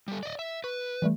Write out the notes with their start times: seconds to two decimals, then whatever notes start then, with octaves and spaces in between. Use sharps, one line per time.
0.08 G3 A4
0.23 D5 D#5
0.39 E5
0.64 B4 C#6
1.02 E3 G3 A3